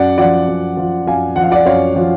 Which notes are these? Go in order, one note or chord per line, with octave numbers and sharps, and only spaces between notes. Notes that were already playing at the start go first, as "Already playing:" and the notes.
Already playing: F#2 D5 F#5
F3 D5 F#5
F#2
F3
F#2 F5 G#5
F3 F#5
F5
D5 F#5
F#2 C#5 F5
F3